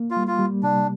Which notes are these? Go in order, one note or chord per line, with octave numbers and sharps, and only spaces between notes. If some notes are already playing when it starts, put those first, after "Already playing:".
Already playing: A#3
F4
G3
F4
G3
C3 D4